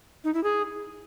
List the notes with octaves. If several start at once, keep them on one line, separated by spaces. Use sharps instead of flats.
D#4
E4
G#4